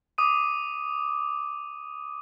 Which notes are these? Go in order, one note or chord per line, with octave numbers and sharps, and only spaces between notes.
D6 D#6 D#7